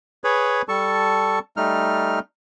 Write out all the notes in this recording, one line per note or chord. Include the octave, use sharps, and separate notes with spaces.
G#4 B4 C#5 B5
G3 A4 A5 C#6
G3 A3 D#4 F6